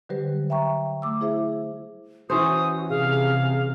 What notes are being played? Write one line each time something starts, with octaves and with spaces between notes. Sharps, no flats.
D3 F#3 G3 G4 B4 C5
E5 G5 A#5 C#6
A3 D6 E6
E4 G#4 C5 E5
E3 C#4 F#4 C5 D#6
C3 G#4 F5